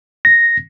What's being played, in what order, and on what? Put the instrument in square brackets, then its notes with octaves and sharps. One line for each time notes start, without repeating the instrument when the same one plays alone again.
[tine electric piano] A#6